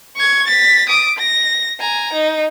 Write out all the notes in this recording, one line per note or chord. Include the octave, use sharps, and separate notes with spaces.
C#6 G#6
A6 B6
D6 D#6
A#6
G#5 A#5
D#4